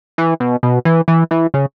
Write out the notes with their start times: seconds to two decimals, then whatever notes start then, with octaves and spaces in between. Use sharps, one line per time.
0.18 E3
0.40 B2
0.63 B2
0.85 E3
1.08 E3
1.31 E3
1.54 C#3